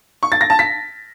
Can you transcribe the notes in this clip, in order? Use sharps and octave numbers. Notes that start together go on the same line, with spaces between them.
C#6
A6
A#6
A5
B6